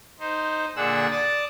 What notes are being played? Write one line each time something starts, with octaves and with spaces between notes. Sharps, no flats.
D#4 C5
A#2 D3 D4 G#4 F#5 E6
D5 A5 D6 D#6